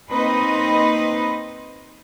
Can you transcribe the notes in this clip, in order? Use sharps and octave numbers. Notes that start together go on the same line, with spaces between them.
A#3 C4 D#4 B4 D#5